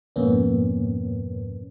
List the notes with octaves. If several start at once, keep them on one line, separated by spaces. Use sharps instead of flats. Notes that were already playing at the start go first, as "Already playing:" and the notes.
F2 G#2 B2 A#3 B3 C#4